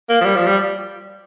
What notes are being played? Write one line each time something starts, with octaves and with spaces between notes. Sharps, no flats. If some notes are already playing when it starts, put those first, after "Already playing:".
A#3
F3
G3
F3
G3